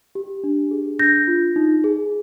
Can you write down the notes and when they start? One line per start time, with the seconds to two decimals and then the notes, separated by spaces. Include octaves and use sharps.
0.15 G4
0.44 D4
0.71 G#4
0.99 D4 G6 A#6
1.28 F4
1.56 D#4
1.84 G#4